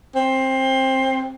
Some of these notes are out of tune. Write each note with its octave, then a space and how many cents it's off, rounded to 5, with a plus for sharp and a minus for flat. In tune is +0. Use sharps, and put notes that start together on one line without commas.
C4 +15